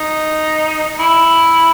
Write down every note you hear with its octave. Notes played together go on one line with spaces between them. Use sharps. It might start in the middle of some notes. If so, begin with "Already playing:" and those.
Already playing: D#4
E4